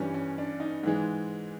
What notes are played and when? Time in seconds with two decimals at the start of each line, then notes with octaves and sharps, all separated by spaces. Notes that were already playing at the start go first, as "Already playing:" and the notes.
Already playing: G2 E3 G3 C#4
0.14 C#4
0.38 D4
0.60 D#4
0.83 G#2 E3 G#3